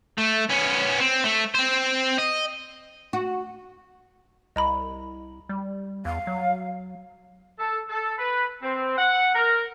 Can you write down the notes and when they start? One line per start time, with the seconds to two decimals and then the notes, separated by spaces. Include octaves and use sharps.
0.18 A3
0.50 B3 C#4
1.00 C4
1.24 A3
1.54 C4 C5
2.18 D#5
3.13 F#4
4.56 C2 D#5 A#5 B5
5.49 G3
6.05 E2 F5
6.27 F#3
7.59 A4
7.89 A4
8.18 B4
8.62 C4
8.98 F#5
9.35 A#4